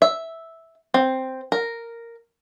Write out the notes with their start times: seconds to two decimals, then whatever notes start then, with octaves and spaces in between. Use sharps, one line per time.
0.02 E5
0.94 C4
1.52 A#4